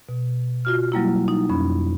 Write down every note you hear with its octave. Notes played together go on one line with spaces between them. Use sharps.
B2
F4 F#4 F6
F#3 G3 A#3 E4
D#4
F2 C#4 B5